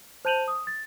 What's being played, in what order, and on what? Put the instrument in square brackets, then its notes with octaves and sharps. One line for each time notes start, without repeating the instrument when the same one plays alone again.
[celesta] C5 A5 G6 D#7 F7 F#7
D#6
A6